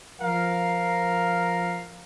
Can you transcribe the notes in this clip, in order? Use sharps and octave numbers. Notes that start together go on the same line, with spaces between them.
F3 A#4 F5